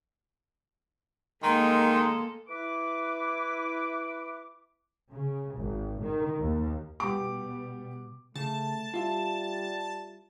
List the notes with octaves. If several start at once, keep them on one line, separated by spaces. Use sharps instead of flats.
D#3 G#3 A#3 A4 A#5 C6
E4 B4 D6
C#3
G#1
D#3
D#2
B2 G3 B3 G4 D6
C#3 A3 A5
G3 F4 E5